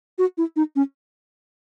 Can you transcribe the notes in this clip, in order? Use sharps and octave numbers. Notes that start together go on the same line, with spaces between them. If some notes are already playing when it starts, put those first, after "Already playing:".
F#4
E4
D#4
C#4